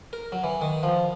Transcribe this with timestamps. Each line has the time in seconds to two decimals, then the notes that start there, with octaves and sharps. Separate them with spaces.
0.13 A#4
0.32 F#3
0.44 E3
0.62 D#3
0.83 F3